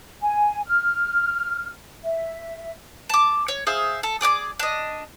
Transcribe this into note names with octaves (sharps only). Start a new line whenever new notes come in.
G#5
F6
E5
A5 D6
C#5
G#4 C5 E5 F5
A4
G#4 D5 C#6 D6
D4 D#5